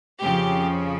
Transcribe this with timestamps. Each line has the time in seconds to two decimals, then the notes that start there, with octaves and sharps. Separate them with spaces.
0.22 F2 C#3 F3 G4